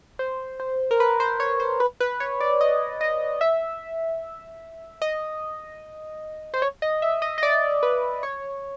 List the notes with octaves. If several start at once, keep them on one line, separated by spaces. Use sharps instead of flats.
C5
C5
A#4
B4
C5
C#5
C5
B4
B4
C#5
D5
D#5
D#5
E5
D#5
C5
C#5
D#5
E5
D#5
D#5
D5
B4
C#5